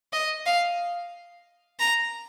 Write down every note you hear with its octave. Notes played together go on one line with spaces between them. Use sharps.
D#5
F5
A#5